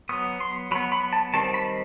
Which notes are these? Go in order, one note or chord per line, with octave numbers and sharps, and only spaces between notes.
F#3 B3 D#6
C6
F#3 B3 B5
B5
A5
D#3 G3 C4 A5
B5